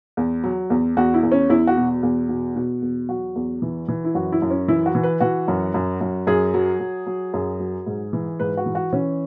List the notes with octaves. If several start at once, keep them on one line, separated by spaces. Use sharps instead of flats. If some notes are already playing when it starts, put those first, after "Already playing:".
E2
F#3
E2
E2 F#4
E4
E2
C#4
E2 E4
F#4
B2
E2
B2
B2
E2
F#3 F#4
E2
E3
E3
E4
F#2 F#4
E4
F#2
C#4
E3 E4
F#4
E3
B4
E3 F#4
F#2
F#2
F#2
F#2 G#4
F#3
F#3
F#3
F#2 G#4
F#3
G#2
E3
G#2 B4
F#4
E3
F#4
E3 C#4